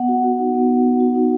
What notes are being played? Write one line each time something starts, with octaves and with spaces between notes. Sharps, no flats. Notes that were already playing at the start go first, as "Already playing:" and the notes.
Already playing: B3 F#5
F#4
F#4
D#4
B3
B3
B3
F#4
D#4